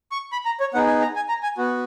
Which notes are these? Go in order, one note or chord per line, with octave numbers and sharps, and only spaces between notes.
C#6
B5
A#5
C#5
B3 D#4 G#4 F#5
G#5
A#5
G#5
A#5
G#5
B3 F#4